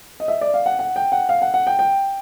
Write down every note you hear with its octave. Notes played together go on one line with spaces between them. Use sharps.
D#5
E5
D5
F5
F#5
F#5
G5
F#5
F5
F#5
F#5
G5
G5